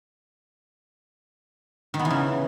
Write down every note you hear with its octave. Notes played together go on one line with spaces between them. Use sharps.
D#3
B3
E3
C#3